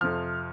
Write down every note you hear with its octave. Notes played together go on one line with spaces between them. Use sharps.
F2 C3 F3 F6